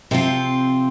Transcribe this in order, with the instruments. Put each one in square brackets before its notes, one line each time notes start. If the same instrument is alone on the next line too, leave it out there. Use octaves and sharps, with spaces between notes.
[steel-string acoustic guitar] C3 F3 C4 F4